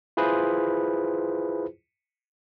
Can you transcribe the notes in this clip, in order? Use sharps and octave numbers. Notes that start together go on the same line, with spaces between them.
E4 F4 G#4 B4 C5